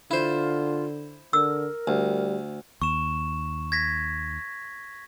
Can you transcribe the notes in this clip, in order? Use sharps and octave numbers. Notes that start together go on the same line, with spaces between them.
D3 E4 F4 C5
D3 A#4 E6
D2 G3
D#2 C#6 E7
G#6 A#6 B6